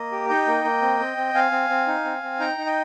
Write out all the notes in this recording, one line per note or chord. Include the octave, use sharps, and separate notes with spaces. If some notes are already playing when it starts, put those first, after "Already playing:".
Already playing: A#3 D#5
G4
D#4 D#5 G5
A#3
A#3
C4
C4
C4
C4 F5 G#5
C4
C4
D#4
C4
C4
D#4 G5 A#5
D#4
D#5 G5